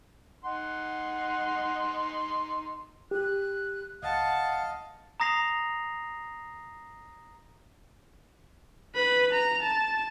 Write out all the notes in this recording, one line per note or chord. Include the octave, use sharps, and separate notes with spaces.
D#4 F#5 C6
G4 F#6
C#2 D#5 F5 F#5 A5
A#5 D#6 A#6 C7 F7
B4 B5
A#5
A5